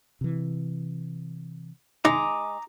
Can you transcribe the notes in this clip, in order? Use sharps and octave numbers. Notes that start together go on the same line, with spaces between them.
C3 E3
G#3 D#4 A#5 D6 D#6